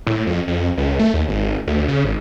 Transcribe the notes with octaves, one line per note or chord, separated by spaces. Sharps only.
A2
F2
F2
C#2
A3
D#2
G#1
D2
C#3
G#1